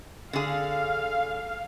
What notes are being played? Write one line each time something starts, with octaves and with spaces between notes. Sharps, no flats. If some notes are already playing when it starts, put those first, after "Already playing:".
D3 G#4 F5